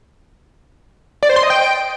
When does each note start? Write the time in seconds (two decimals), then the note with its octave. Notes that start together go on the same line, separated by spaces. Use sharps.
1.23 D5
1.29 C5
1.36 C6
1.43 D#5
1.50 G5